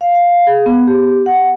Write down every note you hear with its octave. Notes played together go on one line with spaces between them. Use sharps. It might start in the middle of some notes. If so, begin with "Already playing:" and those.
F5
F5
G#4
B3
G4
F#5